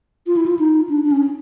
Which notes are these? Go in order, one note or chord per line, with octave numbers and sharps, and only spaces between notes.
F4
E4
F4
D#4
D4
D4
C#4